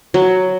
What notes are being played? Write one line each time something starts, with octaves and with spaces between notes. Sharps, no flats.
F#3